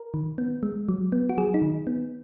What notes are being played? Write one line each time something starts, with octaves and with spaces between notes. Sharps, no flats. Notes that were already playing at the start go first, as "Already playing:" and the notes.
Already playing: A#4
D#3
B3
G#3
F#3
B3
F#4
F#3 G#4
D#4
D#3
B3